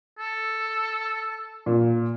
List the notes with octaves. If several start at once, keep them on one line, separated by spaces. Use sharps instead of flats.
A4
A#2